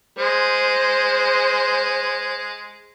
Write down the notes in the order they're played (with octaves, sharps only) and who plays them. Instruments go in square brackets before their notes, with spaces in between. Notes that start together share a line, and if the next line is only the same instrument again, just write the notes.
[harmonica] G#3 [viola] C5